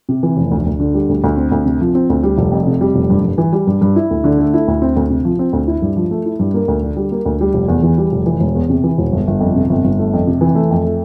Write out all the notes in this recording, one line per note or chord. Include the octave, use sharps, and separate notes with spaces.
C3
E3
F1
D2
D2
D3
G3
D2
D2
C4
D2
C3
F3
C4
D2
G3
F1
F2
C3
G3
F1
G2
G2
E3
G3
G2
G2
E4
D2
D3
A3
E4
D2
C4
D2
C3
F3
C4
D2
E4
G2
F3
A3
E4
G2
A#3
D2
D3
G3
A#3
D2
G3
F1
E2
E3
G3
F1
E3
E1
E2
C3
E3
E1
G1
G1
F2
C3
G1
G1
A3
F2
C3
E3
A3
F2
A3